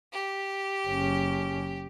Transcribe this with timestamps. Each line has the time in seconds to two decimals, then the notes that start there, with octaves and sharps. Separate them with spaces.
0.12 G4
0.87 F#1 C#4